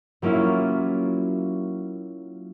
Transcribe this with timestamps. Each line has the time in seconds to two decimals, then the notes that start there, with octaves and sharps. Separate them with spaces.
0.22 F#3 A#3 C#4 E4 F4